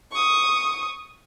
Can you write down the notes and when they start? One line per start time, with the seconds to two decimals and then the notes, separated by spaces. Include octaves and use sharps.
0.13 C#6 D#6